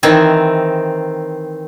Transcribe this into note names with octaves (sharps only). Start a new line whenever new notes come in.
D#3 E3 C4 D#4 E4 B5